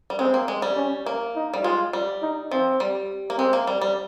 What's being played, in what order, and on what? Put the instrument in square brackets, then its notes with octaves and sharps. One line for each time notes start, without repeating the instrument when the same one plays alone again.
[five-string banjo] G3
[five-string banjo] G#3 [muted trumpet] C4
[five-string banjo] A#3
G#3
G3
[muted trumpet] C#4
[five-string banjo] A#3
[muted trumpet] D#4
[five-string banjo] G3
[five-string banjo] G#3 [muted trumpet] F4
[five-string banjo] G3
[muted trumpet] D#4
[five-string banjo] F3 [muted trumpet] C4
[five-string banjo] G3
A#3
[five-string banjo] G#3 [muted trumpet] C4
[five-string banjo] A#3
G3
G3